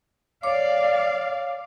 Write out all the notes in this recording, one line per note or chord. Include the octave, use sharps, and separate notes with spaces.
C#5 D5 F5 D6